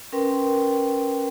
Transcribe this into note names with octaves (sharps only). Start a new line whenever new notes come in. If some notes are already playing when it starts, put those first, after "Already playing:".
C#4 A#4 B4 G5 C6